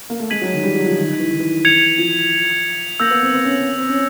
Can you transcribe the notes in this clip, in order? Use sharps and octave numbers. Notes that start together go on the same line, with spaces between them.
A#3
A3
G#3 G#6 B6 D#7 F#7
F#3
D#3
G3
F#3
F3
D#3
D#3
E3
D#3
E3
G#6 C#7 F7
F3
A#3 E6 G6 A#6
B3
C4
C4
C#4
C4
C#4